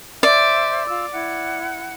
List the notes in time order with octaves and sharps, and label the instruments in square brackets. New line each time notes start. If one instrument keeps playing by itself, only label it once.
[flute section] C5 E5 [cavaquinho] D5
[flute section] F4 E6
E4 F#5